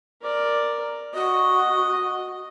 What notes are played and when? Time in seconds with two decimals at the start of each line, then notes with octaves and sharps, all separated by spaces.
0.22 A#4 D5
1.14 F#4 D#5